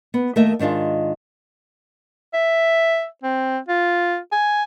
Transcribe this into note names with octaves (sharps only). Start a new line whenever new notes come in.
B3
D#2 A3 A#3 A#4 D#5 E5
G#2 D#3 D4 F4 G#4
E5
C4
F4
G#5